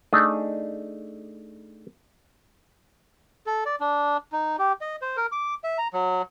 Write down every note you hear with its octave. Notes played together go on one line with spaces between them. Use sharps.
A3 D4 D#4 G#4
A4
D5
D4
D#4
G4
D#5
C5
A#4
D6
E5
A#5
F#3